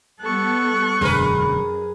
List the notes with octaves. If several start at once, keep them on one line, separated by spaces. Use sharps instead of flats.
G3 B3 A4 C#6 F#6
E1 F#2 D3 G#4 A#4 B4